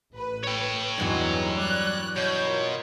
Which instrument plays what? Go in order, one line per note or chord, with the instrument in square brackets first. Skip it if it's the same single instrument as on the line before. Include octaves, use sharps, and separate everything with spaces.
[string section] A1 B4
[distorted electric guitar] C#5 G5
[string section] E2 G#3 D#4 [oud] G2 E3 F#3
[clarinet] G3 [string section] D5 F#6
[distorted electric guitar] B2 [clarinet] C#5 [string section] G6
[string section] F4 A#4